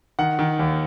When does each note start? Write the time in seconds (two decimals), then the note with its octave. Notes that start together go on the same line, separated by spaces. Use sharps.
0.19 D#3 F#5
0.39 D#3
0.59 D#2